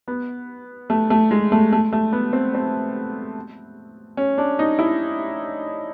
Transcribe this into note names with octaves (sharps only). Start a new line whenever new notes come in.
B3
A3
A3
G#3
A3
A3
A3
B3
C4
C4
C#4
D4
D#4
E4